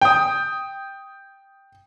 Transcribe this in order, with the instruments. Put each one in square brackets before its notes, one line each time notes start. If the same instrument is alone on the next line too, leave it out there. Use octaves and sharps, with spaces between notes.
[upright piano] G5 D#6